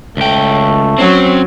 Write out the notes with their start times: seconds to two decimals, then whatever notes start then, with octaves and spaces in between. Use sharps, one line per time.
0.17 C#2 A3 G5
0.98 F#3 C4 C#4